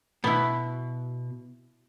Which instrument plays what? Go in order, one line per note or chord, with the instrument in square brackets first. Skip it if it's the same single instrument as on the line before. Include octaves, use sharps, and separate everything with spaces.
[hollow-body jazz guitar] B2 [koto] B3 E4